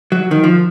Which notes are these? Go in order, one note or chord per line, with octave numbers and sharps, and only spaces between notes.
F#3
D#3
F3